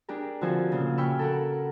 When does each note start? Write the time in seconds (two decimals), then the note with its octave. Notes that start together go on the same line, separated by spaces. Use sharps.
0.09 D4 G4 G#4 A#4
0.41 D3 F3 C4 F#4 C5 G#5
0.72 A#2 C#3
0.97 G5 G#5 B5 C#6 E6 F6
1.19 A4 A#4 F#5